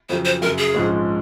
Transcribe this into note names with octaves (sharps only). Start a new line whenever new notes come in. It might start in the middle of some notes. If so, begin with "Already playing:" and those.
F2 C#3 F#3 C5
C5
F#1 F#2 C#3 F#3 A#4
G#4
A#1 G#2 F3 G#3 C#4